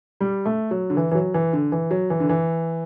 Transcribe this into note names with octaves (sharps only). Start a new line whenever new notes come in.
G3
A3
F#3
D3
E3
E3
F#3
E3
D3
E3
F#3
E3
D3
E3